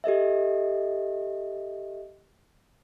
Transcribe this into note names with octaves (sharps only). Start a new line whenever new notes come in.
G4 A4 D#5 E5